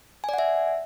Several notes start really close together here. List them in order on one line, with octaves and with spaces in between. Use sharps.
G#5 D5 F#5 E5